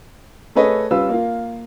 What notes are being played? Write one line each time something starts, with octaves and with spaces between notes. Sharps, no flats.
A3 G#4 A4 B4 C#5 D#5
G3 C#4 F4 B4 E6
A#3 F4